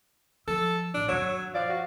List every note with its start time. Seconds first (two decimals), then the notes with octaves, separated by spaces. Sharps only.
0.48 F3 A4 E6
0.94 A1 D4
1.08 D#1 G2 F#3 C#5 E6
1.54 F3 D5 F5
1.70 F#4